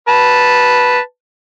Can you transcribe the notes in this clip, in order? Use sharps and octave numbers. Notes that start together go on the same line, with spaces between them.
B4 A5